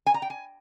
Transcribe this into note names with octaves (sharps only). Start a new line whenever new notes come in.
G#5
A#5
G5
G#5